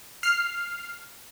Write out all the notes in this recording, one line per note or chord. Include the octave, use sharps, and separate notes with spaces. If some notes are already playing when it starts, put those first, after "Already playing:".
F6 C7